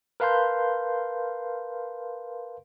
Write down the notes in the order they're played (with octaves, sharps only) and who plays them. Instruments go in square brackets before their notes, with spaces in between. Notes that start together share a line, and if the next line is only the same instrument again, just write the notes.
[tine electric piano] A#4 B4 F5 A5 C6 G6